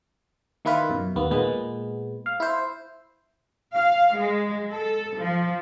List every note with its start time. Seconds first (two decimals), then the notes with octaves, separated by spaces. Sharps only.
0.65 D#3 A#3 E4 F4 B4
0.89 F#2 B2
1.16 D#2 A#3 B3
1.31 A#2 G#3 B3
2.26 F5
2.40 E4 C5
3.75 F5
4.18 G#3
4.71 A4
5.20 F3